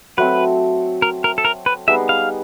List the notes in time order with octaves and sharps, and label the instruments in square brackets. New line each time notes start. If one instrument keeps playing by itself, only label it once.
[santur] F#3 A3 C4 [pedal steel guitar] B4
[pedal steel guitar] A#4
A#4
A4
A#4
B4
[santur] G3 B3 D#4 G#4 [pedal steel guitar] E5
[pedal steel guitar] F5